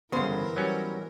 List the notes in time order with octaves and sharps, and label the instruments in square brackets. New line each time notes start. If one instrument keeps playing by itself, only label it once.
[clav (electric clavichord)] G1 C#3 [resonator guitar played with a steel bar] G#2 C5 [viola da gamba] E3 A#4 [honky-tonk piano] B3
[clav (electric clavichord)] F#3 G3 C#4